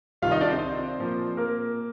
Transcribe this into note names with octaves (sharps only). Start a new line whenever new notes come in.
C2 C3 D#3 F4 F5
D#4 D#5
D4 D5
C4 C5
A#2 F3 A#3
A#3 A#4